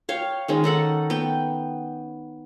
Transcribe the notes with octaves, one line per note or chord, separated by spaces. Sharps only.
C#5 F5 G5
D#3 G#3 C#4
D#4 A4 F#5
B3 G5